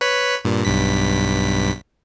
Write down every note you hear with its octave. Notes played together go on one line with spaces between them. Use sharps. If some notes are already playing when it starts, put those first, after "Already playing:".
B4 C#5 B5
G2 A#2
B1 G2 B6